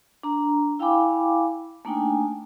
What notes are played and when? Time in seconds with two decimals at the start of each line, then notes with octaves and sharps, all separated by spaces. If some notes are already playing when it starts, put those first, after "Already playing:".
0.23 D4 A#5
0.79 E4 F5 G5 G#5 B5 D6
1.85 A3 A#3 D4 D#4 G5 G#5